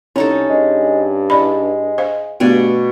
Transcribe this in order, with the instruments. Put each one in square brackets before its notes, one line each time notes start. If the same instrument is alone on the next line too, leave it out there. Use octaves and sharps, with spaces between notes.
[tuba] C2 [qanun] C#4 D#4 A4 [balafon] E4
[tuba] G2 [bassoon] G#3
[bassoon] G#3 [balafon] E4 D5 B5
[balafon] C5 F5
[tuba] G2 [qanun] B2 D5 G#5 [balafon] A3 B3